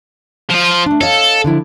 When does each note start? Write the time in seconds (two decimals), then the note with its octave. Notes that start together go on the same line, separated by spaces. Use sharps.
0.51 F3 F4
0.86 A3 D4
1.01 A4 C#5 D#5 F5
1.44 D3 F3 E4